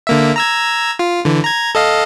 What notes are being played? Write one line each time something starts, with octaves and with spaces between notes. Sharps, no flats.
D3 A#3 E5
A#5 E6 G#6
F4
D3 E3
A#5 G#6
A4 D#5 F5